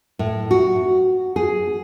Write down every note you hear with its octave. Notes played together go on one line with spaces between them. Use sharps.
A2
F#4
G#4